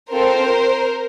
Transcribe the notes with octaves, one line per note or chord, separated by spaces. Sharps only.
C4 F4 A4 A#4 C5